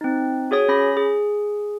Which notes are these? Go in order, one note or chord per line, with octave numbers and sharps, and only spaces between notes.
C4 D#4
F#4 G#4 C#5 D#6
C#4 B5 A#6
G#4